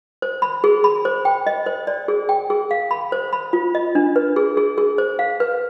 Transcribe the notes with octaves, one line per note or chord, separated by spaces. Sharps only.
C5
B5
G#4
B5
C5
G5
D#5
C5
D5
G#4
G5
G#4
F5
B5
C5
B5
F4
D#5
D4
B4
G#4
G#4
G#4
C5
F5
B4